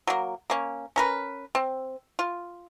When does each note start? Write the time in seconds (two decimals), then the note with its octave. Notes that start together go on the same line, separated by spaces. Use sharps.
0.07 F#3 A#3
0.50 A#3 C#4
0.96 C#4 A#4 B4
1.55 C4
2.19 F4